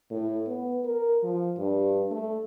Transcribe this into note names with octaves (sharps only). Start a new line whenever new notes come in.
A2
B3
A#4
F3
G2
A3